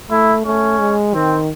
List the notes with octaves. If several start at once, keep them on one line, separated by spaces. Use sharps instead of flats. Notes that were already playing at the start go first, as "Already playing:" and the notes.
A3 E4
A3 C#4
G#3
D#3 C4